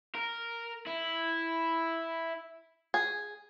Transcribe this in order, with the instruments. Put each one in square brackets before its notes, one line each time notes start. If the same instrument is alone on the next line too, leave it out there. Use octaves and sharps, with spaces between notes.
[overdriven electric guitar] A#4
E4
[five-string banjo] G#4